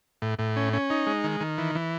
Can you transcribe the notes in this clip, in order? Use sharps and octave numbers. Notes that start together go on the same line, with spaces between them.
A2
A2
C#4
C#4
D#4
G#3
D#3
D#3
E3
E3